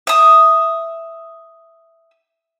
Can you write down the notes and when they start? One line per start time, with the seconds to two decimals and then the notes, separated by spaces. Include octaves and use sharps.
0.07 E5 D#6